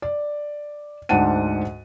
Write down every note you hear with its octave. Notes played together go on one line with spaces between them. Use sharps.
D5
D2 G#2 D4 F#5 A5 D#7